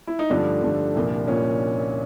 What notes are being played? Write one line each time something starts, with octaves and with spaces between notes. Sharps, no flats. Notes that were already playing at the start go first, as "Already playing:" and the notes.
E4
D#4
G2 D3 F3 A3 D4
G2 D3 F3 A3
C2 A#2 F3 A#3
A#2 F3 A#3 C#4